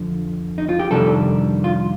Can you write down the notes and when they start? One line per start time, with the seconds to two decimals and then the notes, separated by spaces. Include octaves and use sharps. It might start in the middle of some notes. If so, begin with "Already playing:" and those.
Already playing: F2 D3 F3
0.58 D#4
0.69 F4
0.79 G4
0.91 F2 C3 D#3 G3 D4 A4
1.64 F4